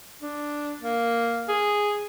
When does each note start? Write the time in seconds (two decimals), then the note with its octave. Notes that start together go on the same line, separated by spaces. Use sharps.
0.22 D4
0.81 A#3
1.48 G#4